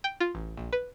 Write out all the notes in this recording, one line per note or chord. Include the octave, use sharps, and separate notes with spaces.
G5
F4
A1
A#1
B4